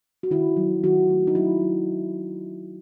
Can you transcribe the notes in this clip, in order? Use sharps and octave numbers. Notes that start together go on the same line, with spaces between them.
F#4
D#3 E4
F#3
D#3 F#4
A3
D#4
F#3 E4
F#3